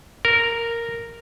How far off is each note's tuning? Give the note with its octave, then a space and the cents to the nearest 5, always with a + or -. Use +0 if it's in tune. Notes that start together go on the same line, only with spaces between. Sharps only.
A#4 -5